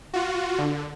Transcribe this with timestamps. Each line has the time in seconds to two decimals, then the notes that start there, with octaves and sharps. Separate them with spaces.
0.14 F4 F#4
0.59 D3